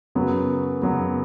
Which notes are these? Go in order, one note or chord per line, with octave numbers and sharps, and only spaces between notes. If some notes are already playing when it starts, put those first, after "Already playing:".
F#2 C#3 F#3 B3
F#2 C#3 F#3 B3